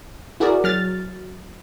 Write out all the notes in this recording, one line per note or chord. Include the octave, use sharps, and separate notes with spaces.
E4 F#4 G#4 A#4 D5
F#3 F6 A6